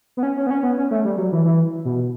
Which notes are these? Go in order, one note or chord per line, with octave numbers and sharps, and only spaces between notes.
B3
C#4
C#4
B3
C#4
B3
C#4
A3
G3
F#3
E3
E3
B2